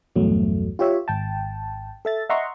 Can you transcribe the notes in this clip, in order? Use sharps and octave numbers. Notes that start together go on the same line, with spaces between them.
A#1 E2 G2 F#3 A3
F4 G4 C#5 E5
G#1 G5 A5
A4 E5 A6
D#5 E5 F#5 A#5 C6 C#6